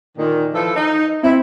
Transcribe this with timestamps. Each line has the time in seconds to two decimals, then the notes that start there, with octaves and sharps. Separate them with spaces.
0.17 A#2 D3 D#3
0.54 E3 F3 A4
0.76 D#4
1.23 C4 E4